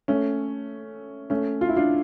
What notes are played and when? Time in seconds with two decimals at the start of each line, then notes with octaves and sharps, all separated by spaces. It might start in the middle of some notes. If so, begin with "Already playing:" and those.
0.08 A3 C#4
1.30 A3 C#4
1.61 F4
1.69 E4
1.76 D4 F4